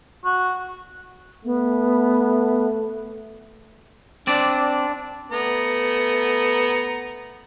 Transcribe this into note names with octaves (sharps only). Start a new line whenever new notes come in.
F#4
A3 B3
C4 D4 D5
A3 B3 A#5